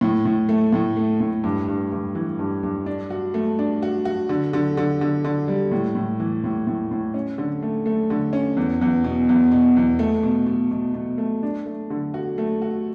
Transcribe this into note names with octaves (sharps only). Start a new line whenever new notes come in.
A2
A2
A3
A2
A3
A2
G2
G2
G2
E3
G2
G2
D4
F#4
A3
D4
F#4
F#4
D3
D3
D3
D3
D3
G3
A2
A2
E3
A2
A2
A2
C#4
D3
A3
A3
D3
C#4
E2
E2
B2
E2
B2
E2
A3
B2
B2
B2
B2
A3
D4
A3
D3
F#4
A3
F#4